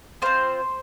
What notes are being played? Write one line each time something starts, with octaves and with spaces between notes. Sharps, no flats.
C4 F4 C5